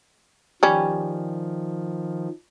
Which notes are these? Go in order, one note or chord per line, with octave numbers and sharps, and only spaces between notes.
D#3 F3 G3 C#4